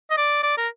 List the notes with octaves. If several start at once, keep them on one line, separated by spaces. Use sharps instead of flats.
D#5
D5
D5
A#4